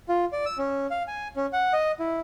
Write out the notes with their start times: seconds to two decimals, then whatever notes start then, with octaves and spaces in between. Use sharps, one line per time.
0.09 F4
0.32 D5
0.46 E6
0.58 C#4
0.91 F5
1.08 G#5
1.36 C#4
1.53 F#5
1.73 D#5
2.00 E4